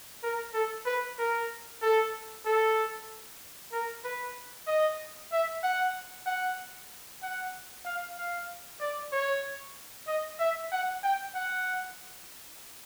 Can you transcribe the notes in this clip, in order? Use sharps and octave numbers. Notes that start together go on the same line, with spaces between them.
A#4
A4
B4
A#4
A4
A4
A#4
B4
D#5
E5
F#5
F#5
F#5
F5
F5
D5
C#5
D#5
E5
F#5
G5
F#5